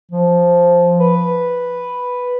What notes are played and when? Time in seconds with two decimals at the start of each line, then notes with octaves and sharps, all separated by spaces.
0.12 F3
1.00 B4